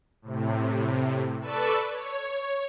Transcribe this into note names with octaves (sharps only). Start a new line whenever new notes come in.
A2 C3
A4 B4 D5 A5 C#6 E6
C#5